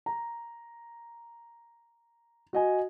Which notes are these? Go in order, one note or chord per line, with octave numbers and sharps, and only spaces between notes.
A#5
F#4 D#5 G#5